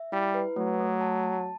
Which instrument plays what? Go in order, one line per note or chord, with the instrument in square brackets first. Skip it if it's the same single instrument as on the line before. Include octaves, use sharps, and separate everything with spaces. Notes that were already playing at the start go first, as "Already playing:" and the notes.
Already playing: [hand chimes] E5
[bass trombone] G3 [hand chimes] E4
[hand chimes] B4
[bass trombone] F#3 [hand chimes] A3
[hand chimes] A3
A5
A5